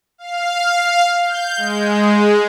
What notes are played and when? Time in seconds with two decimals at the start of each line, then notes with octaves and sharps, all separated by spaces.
0.18 F5
1.23 G6
1.57 G#3